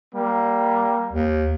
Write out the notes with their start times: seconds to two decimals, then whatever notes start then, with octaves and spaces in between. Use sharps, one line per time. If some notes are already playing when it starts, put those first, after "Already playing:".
0.15 G3 A#3
1.13 D#2